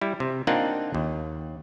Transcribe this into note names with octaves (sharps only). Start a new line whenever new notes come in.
G3 E4
C3
A#3 C4 D4 D#4 F4 F#5
D#2